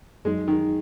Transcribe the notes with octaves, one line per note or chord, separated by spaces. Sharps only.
F#2 F#3 G#3 D#4 G#4
D#3